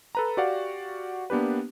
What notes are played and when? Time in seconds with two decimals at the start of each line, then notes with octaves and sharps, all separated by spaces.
0.15 A4 B4 A#5
0.37 F#4 G4 D5 F5 F#5
1.30 A#3 B3 D4 G4 B4